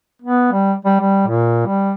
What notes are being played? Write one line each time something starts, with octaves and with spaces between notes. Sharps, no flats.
B3
G3
G3
G3
A#2
G3